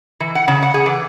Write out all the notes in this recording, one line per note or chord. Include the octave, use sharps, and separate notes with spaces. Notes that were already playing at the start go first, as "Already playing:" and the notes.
E3
F#5
C#3
F#5
G#4
E3